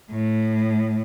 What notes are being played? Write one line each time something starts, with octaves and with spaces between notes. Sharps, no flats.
A2